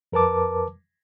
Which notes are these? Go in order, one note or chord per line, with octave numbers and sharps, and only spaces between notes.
F2 A#4 B4 A5 D6